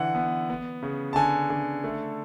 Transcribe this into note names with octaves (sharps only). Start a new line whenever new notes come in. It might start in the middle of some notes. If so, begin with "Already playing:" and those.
Already playing: D3 E3 F#5
B3
B3
C#3
A5
D3 G#5
D3
A3